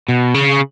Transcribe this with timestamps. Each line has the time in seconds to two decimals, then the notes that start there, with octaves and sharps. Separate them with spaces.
0.08 B2
0.34 C#3